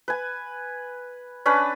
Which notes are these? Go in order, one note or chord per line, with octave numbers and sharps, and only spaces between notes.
B4 G#5
C#4 D4 B4 D5